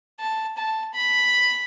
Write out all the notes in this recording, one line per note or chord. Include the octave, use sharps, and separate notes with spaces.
A5
A5
B5